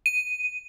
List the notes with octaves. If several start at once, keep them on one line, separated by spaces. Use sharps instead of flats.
D#7